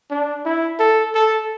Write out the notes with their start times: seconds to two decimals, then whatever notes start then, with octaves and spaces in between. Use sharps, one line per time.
0.10 D4
0.45 E4
0.79 A4
1.15 A4